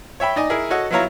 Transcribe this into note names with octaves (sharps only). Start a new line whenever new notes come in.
C#5 E5 G5 B5
D#4 D5 D#5 G#5
E4 G#4 A#4
F#4 A4 C#5 D#5 F#5
F#3 B3 E4 F4 C#5 A#5